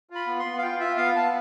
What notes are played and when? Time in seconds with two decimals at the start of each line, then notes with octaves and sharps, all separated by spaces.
0.10 F4
0.15 B5
0.27 B3
0.39 C6
0.45 B3
0.58 F5
0.62 F4 G5
0.80 F4 E5
0.97 B3 F5
1.16 B3 A5